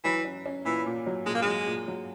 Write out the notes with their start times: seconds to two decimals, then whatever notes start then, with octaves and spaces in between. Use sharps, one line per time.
0.04 E3 F#3
0.25 C#4
0.46 C#4
0.65 A#2 E3
0.86 A#2
1.06 F#3
1.26 A#2 G#3
1.35 A#3
1.42 G#3
1.47 F#3
1.67 A#2
1.88 F#3